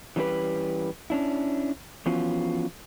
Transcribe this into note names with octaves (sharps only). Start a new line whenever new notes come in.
E3 G3 C#4 D4 G4 B4
C#4 D4 E4
E3 F3 B3 C#4 F4 F#4